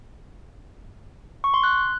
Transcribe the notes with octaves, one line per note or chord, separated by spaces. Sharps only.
C#6
C6
F#6